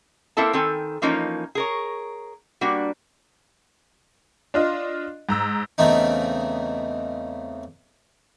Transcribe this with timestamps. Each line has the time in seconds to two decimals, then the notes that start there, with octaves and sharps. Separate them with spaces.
0.37 A#3 C4 E4 A4 A5
0.53 D#3 C4 A4 G#5
1.02 E3 F3 A#3 C#4 D#4
1.55 G#4 A#4 C#5
2.61 G3 A#3 D4 F#4
4.54 D4 F4 D#5
5.29 G#2 A#5 E6
5.78 E2 C#3 A3 C4 D#4